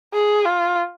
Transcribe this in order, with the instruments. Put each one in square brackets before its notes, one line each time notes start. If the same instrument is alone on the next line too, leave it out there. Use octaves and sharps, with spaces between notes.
[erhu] G#4
F4